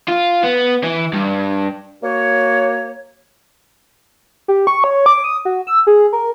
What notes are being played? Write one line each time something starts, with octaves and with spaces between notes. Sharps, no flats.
F4
B3
E3
G2
A#3 F#4 C#5
G4
C#6
C#5
D6
D#6
F#4
E6
G#4
A#4